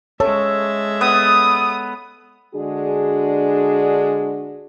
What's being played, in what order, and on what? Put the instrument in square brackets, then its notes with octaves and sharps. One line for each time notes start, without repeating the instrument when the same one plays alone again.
[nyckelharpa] G#3 E5 [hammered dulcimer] A4 [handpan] C#5
[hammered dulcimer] B3 [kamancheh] D#6
[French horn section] D3 G#3 D4 F#4 G#4